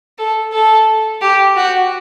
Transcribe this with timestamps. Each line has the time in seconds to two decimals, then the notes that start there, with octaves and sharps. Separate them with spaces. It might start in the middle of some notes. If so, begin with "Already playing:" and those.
0.18 A4
0.53 A4
1.21 G4
1.56 F#4